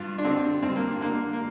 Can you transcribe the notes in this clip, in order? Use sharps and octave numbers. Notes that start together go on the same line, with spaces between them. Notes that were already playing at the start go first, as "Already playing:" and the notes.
Already playing: G2 F4
D4
D3 C4
G2 C4
A#3
D3 A#3
A#3